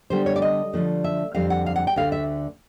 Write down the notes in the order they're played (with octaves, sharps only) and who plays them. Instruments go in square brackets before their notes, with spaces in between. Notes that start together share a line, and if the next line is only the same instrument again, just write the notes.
[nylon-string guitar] D3 G3 B3 D4 C5
C#5
D5
D#5
D3 F3 A3 D4
E5
F2 D3 G3 C4 F5
F#5
F5
F#5
G5
D2 D3 F#3 A3 F5
E5